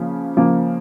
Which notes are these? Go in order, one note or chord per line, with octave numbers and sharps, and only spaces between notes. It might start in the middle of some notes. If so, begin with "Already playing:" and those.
Already playing: C#3 F3 A#3
C#3 F3 A#3